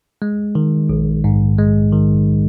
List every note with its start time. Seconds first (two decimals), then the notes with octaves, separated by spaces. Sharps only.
0.22 G#3
0.55 D#3
0.89 A#1
1.24 G#2
1.58 G#3
1.92 D#3